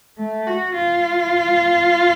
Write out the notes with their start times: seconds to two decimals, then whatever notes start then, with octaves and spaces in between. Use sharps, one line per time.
0.18 A3
0.47 F#4
0.75 F4